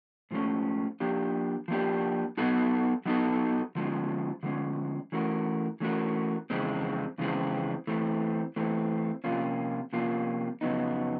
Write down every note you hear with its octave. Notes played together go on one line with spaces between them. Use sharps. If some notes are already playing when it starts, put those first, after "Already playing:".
G#2 F3 A3 C#4
F3 A#3 D4 G4
F3 A#3 D4 G4
F#3 B3 D#4 F#4 A4
F#3 B3 D#4 F#4 A4
D3 F3 G#3 C#4
D3 F3 G#3 C#4
E3 A3 C#4 F#4 A#4
E3 A3 C#4 F#4 A#4
F2 C#3 E3 G#3 C4
F2 C#3 E3 G#3 C4
E3 A3 C4
E3 A3 C4
C3 F3 A#3 C#4 F4
C3 F3 A#3 C#4 F4
F2 C#3 F#3 B3 D#4